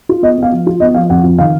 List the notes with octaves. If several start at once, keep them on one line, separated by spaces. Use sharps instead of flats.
F4
B3 D#5
B3 F5
F3
F4
B3 D#5
F3 F5
F2 F#5
F2
D#3 F5